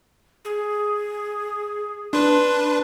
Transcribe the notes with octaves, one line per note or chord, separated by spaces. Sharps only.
G#4
D4 B4 C6